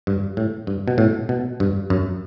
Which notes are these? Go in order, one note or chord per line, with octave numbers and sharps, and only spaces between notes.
G2
A2
G2
B2
A2
B2
G2
F#2